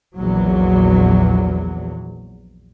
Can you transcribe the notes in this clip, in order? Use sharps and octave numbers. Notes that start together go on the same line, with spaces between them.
A#1 E2 F#3